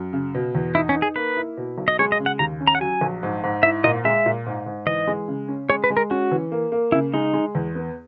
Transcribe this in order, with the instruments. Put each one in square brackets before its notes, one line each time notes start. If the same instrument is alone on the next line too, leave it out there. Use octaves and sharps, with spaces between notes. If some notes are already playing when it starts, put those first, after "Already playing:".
Already playing: [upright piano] F#2
C#3
B2
E2
[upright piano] D#4 [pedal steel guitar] E4
[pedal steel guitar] C#4
[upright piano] D#4
[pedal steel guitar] G#4
[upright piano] A#3 [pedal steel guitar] B4
[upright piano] E4
B2
B1
[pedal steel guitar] D#5
[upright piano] G#3 [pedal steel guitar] C#5
[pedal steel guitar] D#5
[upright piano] C#3
[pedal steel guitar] F#5
[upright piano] D#2 [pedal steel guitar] A#5
[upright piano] C#4
[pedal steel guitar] A#5
F#5
[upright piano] F#3 [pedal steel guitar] G#5
[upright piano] A#1
G#2
G#2
[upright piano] E4 [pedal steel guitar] E5
[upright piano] A#2 [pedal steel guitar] D#5
[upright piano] G#3 [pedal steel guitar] E5
[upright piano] A#2
G#2
G#2
[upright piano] E3 [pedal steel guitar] D#5
[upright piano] G#3
C#3
C#4
[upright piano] G#3 [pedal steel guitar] C#5
[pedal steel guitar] B4
[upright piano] G#3
[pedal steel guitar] A#4
[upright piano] C#4 [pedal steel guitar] F#4
[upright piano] E3
A#3
A#3
[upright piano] C#3 [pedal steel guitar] E4
[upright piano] G#3 [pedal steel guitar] D#4
[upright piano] G#3
E2
B3